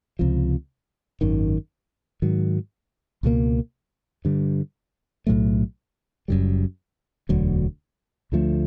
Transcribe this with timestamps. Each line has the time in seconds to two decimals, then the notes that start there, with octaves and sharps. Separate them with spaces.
0.19 C#2 C3 F3
1.21 G#1 F#2 D#3
2.22 G#2 D#3 F#3
3.23 C#2 B2 G3 A#3
4.25 G2 D3 G3
5.27 B1 A2 F#3 A3
6.28 F#1 F#2 D3 G3
7.29 E1 D2 D3 F#3
8.32 D2 D3 F3 A3